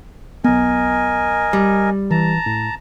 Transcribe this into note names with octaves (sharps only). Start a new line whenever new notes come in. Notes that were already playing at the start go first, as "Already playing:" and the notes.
B1 B3 A#4 D#5 G#5
G3
E3 A5 A#5
A2